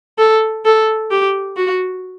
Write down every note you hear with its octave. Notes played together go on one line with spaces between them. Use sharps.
A4
A4
G4
F#4